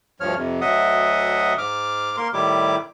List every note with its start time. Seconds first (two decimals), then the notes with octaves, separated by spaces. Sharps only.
0.20 D2 G2 F3 C#5 F6
0.37 F2 C3
0.61 D2 F#3 D#5 E5 F#5 D#6
1.58 G#2 D6 F6
2.17 A#3 A#4 C6
2.33 A2 D#3 G3 E4 G4 D6